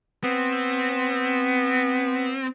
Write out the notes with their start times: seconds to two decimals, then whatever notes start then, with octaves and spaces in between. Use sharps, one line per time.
0.24 B3 C4